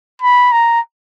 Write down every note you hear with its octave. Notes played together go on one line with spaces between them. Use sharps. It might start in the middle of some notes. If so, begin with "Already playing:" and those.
B5
A#5